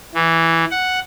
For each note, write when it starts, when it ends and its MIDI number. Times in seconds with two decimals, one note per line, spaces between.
0.15 0.65 52
0.71 0.99 78